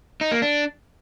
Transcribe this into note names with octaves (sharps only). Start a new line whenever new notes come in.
D#4
A#3
D4